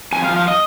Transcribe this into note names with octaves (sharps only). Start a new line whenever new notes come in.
F2 G#5
F5
F3
F5
D#5